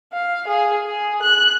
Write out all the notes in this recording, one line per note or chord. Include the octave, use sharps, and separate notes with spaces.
F5
G#4
G#4
F#6